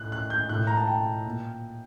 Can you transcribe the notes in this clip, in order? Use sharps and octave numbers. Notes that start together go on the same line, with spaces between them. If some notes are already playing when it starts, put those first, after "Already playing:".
Already playing: A2 F#6
F#6
G6
A2 F#6
A#5
A5
G5
A#2